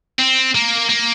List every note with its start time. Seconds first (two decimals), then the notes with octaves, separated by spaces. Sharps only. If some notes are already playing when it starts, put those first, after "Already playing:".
0.19 C4
0.55 A#3
0.89 A#3